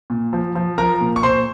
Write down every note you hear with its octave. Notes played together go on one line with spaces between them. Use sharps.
A#2
F3
F3
F3 A#4 A#5
A#2
C#6
A#2 C5 C6